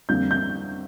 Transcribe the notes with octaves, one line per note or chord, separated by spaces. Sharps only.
F2 D3 G3 A#3 G6
G6